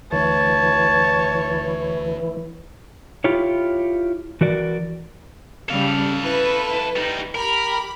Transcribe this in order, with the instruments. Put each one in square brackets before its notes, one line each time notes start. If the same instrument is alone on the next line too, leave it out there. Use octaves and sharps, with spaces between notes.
[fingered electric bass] D2 D3 A3 [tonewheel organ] E3 [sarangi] C#5 [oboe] A5
[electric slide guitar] E4 F4 G4 C#5
E3 F#4 A#4 D5
[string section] C#3 G3 [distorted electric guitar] A4 F5
[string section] E4 B4
[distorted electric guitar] G3 D#4
[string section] G4 B5 [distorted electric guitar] A#4